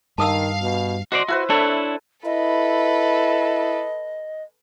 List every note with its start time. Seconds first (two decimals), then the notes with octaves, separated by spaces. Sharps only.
0.18 G2 D#3 F5 A5 D#6 E6
0.61 B2
1.12 F#4 C5 D5 D#5 C6
1.28 E4 F#4 B4 C5
1.50 D4 E4 A4 C#5
2.25 E4 A4 B4 D#5